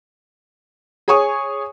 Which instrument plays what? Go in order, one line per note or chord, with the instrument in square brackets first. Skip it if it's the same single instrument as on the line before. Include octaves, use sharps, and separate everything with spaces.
[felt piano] G#4 C#5 G#5 C#6 D#6